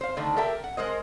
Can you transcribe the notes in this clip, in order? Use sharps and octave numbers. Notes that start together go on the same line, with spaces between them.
C5 F5
D3 D#3 A3 D4 D#4
G4 A4 A#4 E5 G5
F#5
G#3 A#4 C5 D#5